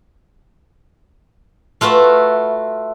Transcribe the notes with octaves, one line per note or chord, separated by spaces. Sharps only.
A3 F4 F#4 B4 E5